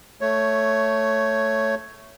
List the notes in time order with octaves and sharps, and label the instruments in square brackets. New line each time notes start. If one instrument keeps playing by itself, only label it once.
[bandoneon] A3 C#5